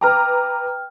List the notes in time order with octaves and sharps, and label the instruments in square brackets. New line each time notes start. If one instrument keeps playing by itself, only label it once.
[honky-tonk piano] B4 A#5 D6 [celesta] G5 F6